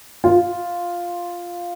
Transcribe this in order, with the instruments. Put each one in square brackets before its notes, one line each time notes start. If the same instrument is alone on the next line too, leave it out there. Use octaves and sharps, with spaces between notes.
[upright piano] F4